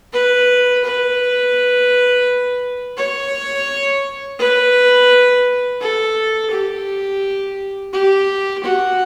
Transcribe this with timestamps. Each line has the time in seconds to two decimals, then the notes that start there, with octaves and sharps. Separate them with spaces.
0.13 B4
0.84 B4
2.97 C#5
4.39 B4
5.81 A4
6.51 G4
7.93 G4
8.64 F#4